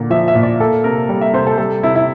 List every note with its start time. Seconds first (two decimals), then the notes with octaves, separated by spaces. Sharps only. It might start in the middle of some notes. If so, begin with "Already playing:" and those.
Already playing: A#2 D3 A#3
0.10 F3 E5
0.28 E5
0.35 A#2
0.43 D5
0.60 A#3 A4
0.84 C3 A#4
1.09 G3
1.21 E5
1.33 C3 C5
1.47 A4
1.58 G3 A4
1.83 C3 E4
1.95 E4